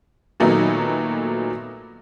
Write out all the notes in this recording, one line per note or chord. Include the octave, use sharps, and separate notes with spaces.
A#2 D#3 F#3 A3 B3 D#4